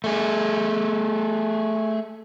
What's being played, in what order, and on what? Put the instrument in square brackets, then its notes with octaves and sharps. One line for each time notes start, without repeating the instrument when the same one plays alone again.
[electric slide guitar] A3 G#4